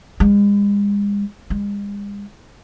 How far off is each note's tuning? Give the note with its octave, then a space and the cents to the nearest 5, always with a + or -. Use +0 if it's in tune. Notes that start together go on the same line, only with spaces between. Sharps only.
G#3 -40
G#3 -45